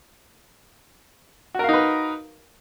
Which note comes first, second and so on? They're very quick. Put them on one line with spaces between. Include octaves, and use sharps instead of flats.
F#4 A#4 F5 D#4 B4